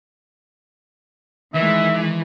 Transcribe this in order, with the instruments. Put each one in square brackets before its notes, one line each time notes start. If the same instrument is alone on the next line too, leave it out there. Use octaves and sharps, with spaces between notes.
[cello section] D#3 G#3 [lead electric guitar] E3 [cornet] E5